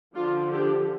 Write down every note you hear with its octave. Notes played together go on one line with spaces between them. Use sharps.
D3 F3 D4 F4
D4 G4